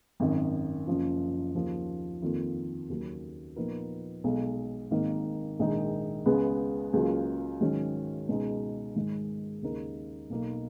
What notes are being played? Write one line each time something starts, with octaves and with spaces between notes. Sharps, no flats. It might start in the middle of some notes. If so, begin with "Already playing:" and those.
G#1 F#2 D#3
F#1 F#2 F3
D#2 C#3 F3
F2 D#3 A#3 F4
D#2 C#3 F#3
A#2 F3 B3 D#4 A#4
B1 B2 G#3
G#1 G#2 D#3 A#3 D#4
A#1 G#2 D#3 G#3 D#4
C#2 C#3 G#3 B3
C#2 C#3 F#3 A#3 F4
G#2 D#3 F#3 C#4
C#2 B2 G#3 D#4
G#2 D#3 G#3
D#2 C#3 G#3 D#4 A#4
B1 B2 A#3 D#4